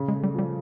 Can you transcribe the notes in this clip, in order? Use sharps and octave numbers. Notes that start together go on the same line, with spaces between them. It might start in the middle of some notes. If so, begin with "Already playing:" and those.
Already playing: C#3
G#3
A3
G3
F3 G3